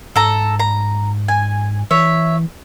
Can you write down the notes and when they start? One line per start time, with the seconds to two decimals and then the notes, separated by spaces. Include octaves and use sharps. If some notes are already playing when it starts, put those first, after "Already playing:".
0.16 G#2 A4 A#5
0.60 A#5
1.28 G#5
1.91 E3 C#5 E5